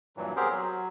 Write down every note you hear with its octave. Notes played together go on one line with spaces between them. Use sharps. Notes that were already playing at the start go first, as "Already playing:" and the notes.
G2 A#2 E3 F#3
B3 C4 G4 G#4 A#4 C5
F#3